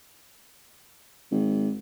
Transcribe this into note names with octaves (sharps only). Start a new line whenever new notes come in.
G#1